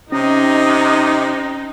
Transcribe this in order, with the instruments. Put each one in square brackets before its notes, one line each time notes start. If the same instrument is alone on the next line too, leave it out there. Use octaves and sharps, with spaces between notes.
[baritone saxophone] C3 [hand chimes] C#4 [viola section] D#4 [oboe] D#5